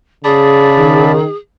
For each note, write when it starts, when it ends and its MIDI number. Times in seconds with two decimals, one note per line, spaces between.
0.24 1.19 49
0.24 1.35 68
0.24 1.12 74
0.24 1.12 81
0.24 1.12 83
0.78 1.26 51